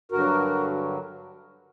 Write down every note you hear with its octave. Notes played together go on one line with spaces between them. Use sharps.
G2 D3 F#3 F#4 A#4